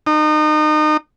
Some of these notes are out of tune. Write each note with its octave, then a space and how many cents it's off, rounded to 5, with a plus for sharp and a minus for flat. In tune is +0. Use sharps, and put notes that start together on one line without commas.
D#4 -30